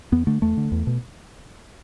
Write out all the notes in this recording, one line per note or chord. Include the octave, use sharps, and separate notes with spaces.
E2 B3
D3 A3
E2 A3
D3
E2
B2